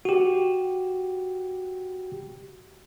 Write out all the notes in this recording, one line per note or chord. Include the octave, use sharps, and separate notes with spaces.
F#4 G4